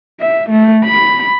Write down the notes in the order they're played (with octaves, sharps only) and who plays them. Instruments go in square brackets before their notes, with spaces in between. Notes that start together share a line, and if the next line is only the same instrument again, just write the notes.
[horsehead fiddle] E5
A3
B5